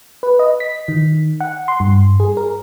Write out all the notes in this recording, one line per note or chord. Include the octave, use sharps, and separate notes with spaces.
B4
D#5
B6
D#3
F#5
C6
G2
G#4
A#4